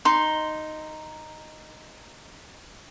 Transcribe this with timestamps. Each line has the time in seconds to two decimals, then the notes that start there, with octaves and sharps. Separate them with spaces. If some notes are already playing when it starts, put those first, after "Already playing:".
0.05 D#4 C6